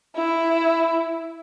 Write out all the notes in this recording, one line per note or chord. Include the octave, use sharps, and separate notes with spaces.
E4